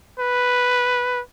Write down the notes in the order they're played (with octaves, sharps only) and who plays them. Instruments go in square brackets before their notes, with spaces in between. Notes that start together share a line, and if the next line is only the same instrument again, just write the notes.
[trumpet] B4